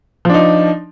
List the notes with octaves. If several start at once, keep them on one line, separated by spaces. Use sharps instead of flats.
F3 D4 D#4